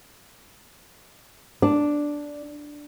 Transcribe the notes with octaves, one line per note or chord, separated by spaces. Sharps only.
D4